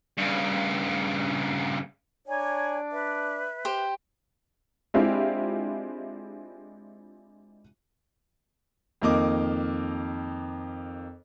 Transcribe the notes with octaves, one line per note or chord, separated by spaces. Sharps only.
G2 C#3
D4 C#5 D5 G#5 A#5
B4 E5
G4 C5
G#3 C4 D4 E4 F4 G4
F2 D#3 A#3 D#5 D6